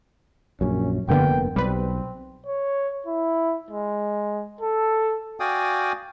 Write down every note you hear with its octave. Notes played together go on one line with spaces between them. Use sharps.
A#1 F#2 C#4
F1 G2 D3 A#3 B3 G5
B1 G3 C4 B4
C#5
E4
G#3
A4
F#4 D5 F5 G5 G#5 D#6